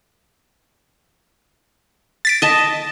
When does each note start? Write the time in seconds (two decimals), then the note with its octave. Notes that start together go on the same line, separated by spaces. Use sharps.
2.25 A6 B6 D7
2.42 D#5 A5